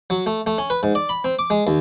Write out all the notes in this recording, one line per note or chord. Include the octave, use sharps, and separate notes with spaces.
F#3
A3
A3
C#4
B4
G#2
D5
B5
C4
D6
G#3
D#2